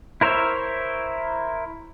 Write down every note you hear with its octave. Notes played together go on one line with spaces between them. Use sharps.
E4 A#4 C5 C#5 E5